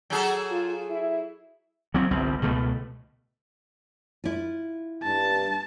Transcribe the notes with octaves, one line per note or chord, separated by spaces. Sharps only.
F#3 G#4 A4
F4
E4
F#3 C4
G1 C2 C4
C#2 B2 A3
E4 F4
G2 A5